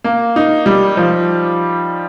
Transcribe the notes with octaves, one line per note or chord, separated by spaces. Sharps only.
A#3
D#4
G3
F3